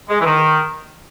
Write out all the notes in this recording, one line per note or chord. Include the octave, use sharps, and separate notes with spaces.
G#3
E3
D#3